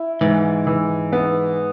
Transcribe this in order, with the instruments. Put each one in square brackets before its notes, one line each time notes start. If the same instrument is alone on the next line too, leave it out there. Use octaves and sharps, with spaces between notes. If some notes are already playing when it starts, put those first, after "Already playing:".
Already playing: [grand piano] E4
[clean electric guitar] G#2 [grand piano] E3
[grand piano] E3
B3